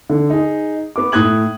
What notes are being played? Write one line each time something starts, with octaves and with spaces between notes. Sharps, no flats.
D3
D#4 G#4
B3 D6
A2 D#6 F#6 G#6 F#7